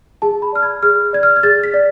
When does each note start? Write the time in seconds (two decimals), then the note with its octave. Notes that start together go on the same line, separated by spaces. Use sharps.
0.22 G#4 A5
0.42 B5
0.52 D5 F6
0.63 G#6
0.83 G#4 F6
1.13 D5 G#6
1.23 F6
1.36 G#6
1.43 G#4 A6
1.64 B6
1.74 D5